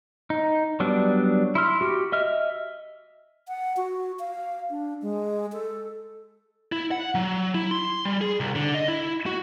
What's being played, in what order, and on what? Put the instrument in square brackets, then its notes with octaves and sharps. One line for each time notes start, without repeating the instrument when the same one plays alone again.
[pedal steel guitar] D#4
F#3 G3 B3 D4
E4 C6 F6
F#4 G4
D#5 E5 F6
[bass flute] F#5
F#4
F5
D4
G#3
A4
[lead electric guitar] E4
F#5
F#3
E4
C6
G3
G#4
C2
D3
D#5
E4
F#4